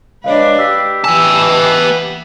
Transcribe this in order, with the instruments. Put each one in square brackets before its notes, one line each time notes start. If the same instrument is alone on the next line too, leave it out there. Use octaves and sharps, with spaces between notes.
[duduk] G#3 [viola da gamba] D4 B4 [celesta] C#5 D#5 F5
[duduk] G4 [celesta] E6 B6
[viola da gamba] E3 [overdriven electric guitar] B3 A5 [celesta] G#5 E6